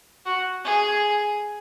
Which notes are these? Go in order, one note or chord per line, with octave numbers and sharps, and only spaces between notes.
F#4
G#4